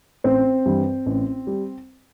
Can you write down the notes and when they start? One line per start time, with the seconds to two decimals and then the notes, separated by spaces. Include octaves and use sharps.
0.24 A1 C4 C5
0.66 G2 E3 G3
1.06 A1
1.47 G3